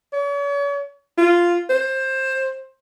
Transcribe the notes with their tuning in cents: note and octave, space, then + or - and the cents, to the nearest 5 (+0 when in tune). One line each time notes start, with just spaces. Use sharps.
C#5 +40
F4 -5
C5 +15